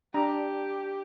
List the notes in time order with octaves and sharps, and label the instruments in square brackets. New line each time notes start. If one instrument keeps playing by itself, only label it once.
[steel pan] D4 A#5 [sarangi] G4